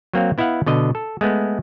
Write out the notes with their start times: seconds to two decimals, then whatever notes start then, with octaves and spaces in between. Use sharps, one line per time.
0.13 F#3 A#3 C4 F5
0.38 B3 E4 D#5 F5 F#5
0.66 B2 D3 D#5
0.95 A4
1.21 G#3 A3 B3